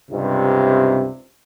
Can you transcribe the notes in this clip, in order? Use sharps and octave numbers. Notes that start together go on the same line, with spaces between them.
C#2 G2 C3